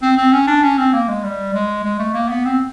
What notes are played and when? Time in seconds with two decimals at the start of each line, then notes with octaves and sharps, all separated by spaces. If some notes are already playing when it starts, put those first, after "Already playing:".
0.02 C4
0.17 C4
0.33 C#4
0.47 D4
0.63 C#4
0.78 C4
0.93 A#3
1.08 G#3
1.23 G3
1.53 G#3
1.84 G#3
1.99 A3
2.14 A#3
2.29 B3
2.45 C4